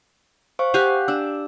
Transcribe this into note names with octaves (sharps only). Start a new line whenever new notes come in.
C5 F5 C#6
G4 F5 F#5 G#5 F#6
D4 E6